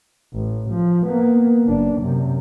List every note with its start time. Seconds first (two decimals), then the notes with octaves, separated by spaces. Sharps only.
0.33 A1
0.70 F3
1.04 A#3 B3
1.66 F#1 D4
2.00 F#2 C3